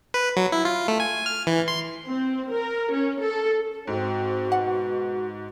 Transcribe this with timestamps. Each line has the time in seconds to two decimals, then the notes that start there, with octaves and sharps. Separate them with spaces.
0.14 B4
0.37 F#3
0.52 E4
0.65 F4
0.88 A3
1.00 G#5
1.26 F6
1.47 E3
1.68 C6
2.06 C4
2.52 A#4
2.91 C#4
3.22 A4
3.87 G#2 C4 F#4
4.52 B2 F#5